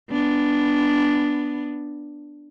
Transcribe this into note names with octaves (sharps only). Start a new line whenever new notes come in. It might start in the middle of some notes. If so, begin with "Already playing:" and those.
B3 D4